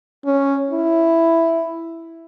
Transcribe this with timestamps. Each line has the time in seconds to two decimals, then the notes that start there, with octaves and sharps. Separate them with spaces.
0.26 C#4
0.71 E4